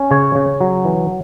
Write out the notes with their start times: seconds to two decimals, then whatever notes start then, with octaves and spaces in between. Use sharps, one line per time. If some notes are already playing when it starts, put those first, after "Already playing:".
Already playing: C#4
0.11 C#3 C#5
0.35 C#3
0.60 F#3
0.85 E3